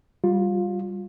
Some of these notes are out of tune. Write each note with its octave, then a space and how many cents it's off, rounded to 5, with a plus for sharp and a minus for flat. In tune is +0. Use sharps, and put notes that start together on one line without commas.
G3 +0 F4 +20